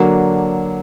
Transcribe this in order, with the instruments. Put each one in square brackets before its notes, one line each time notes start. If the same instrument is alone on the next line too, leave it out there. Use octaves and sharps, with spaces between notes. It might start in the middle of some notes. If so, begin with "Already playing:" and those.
Already playing: [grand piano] D3 F#3 A#3 D4